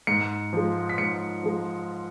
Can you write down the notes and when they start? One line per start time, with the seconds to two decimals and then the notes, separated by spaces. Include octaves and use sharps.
0.07 G#2 C#7
0.53 F3 G#3
0.89 B6
0.98 G#2 C#7
1.43 F3 G#3